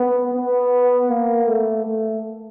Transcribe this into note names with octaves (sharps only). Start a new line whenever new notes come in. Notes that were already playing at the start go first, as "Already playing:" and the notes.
Already playing: B3
B3
A#3
A3
A3